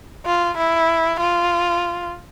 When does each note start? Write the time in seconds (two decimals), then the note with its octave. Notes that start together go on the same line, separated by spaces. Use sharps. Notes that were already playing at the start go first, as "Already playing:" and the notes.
0.26 F4
0.58 E4
1.20 F4